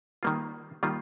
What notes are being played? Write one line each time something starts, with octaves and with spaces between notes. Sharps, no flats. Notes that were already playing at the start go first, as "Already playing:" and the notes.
D#3 G3 A#3 F4
D#3 G3 A#3 F4